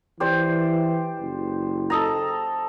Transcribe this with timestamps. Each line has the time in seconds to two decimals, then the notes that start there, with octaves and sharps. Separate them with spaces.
0.20 E3 G4 C5 D5
1.20 F#1
1.90 A4 D#5 A#5